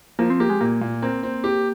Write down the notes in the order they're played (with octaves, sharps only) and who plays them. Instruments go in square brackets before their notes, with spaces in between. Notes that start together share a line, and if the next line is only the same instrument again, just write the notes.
[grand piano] F3 [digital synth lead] A#3
[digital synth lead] C4
[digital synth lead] A#3 [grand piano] G4
[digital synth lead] G#3
[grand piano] A#2 [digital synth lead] A#3
[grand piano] A#2
[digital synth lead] A#3 [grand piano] C4
[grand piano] C4
G4